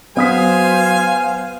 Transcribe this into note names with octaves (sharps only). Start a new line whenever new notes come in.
F#3 B3 C5 F5 G#5 D#6 B6